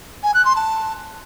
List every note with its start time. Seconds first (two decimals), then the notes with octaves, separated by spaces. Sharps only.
0.23 G#5
0.34 F#6
0.45 C6
0.56 A5